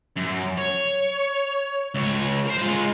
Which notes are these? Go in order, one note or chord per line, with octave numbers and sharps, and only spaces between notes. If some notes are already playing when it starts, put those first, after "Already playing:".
F#2
C#5
C#2 C#5
A#4 C5
G#3 F4